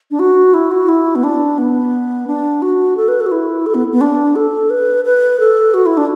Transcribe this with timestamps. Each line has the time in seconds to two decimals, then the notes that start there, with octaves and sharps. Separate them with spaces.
0.11 D4
0.19 F#4
0.54 E4
0.71 F#4
0.89 E4
1.16 B3
1.24 D4
1.58 B3
2.27 D4
2.62 F#4
2.97 A4
3.08 B4
3.20 A4
3.26 F#4
3.32 E4
3.66 A4
3.75 B3
3.92 B3
4.01 D4
4.36 A4
4.70 B4
5.05 B4
5.40 A4
5.74 F#4
5.86 E4
5.97 D4